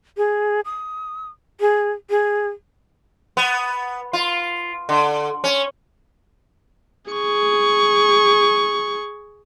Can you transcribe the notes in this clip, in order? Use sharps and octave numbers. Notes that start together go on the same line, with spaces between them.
G#4
D#6
G#4
G#4
B3
F4
D3
C#4
G#4 C#6